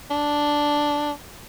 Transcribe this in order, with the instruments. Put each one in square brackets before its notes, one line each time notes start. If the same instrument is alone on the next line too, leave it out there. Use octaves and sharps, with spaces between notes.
[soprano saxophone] D4